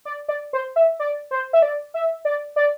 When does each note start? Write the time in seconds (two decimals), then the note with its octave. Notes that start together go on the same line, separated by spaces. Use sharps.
0.05 D5
0.28 D5
0.53 C5
0.76 E5
1.00 D5
1.31 C5
1.53 E5
1.62 D5
1.94 E5
2.25 D5
2.56 D5